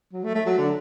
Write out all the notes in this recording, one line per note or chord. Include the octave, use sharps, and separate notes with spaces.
F#3
A3
A3
F#3
D3